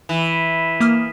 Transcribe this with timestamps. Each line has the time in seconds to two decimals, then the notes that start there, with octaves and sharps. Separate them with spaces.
0.09 E3
0.80 A#3 D#6 F6